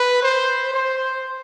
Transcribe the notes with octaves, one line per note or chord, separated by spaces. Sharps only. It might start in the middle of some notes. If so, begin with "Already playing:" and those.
Already playing: B4
C5
C5